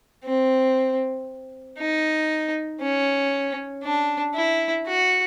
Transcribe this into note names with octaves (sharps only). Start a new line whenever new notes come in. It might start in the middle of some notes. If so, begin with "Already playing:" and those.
C4
D#4
C#4
D4
E4
F#4